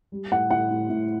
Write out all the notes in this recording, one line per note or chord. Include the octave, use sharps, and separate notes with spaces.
G3
A2 F#5
A2 F#5
A2
A2